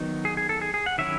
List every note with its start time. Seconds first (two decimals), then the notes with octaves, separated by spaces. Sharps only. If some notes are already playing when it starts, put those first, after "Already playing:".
Already playing: D#3 F#3 B3 D#4
0.25 G#4
0.37 G#4
0.49 A4
0.61 G#4
0.74 G#4
0.86 F#5
0.98 D#3 F#3 C#4 E4 E5